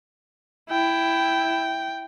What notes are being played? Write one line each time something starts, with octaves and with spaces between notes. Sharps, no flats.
E4 G5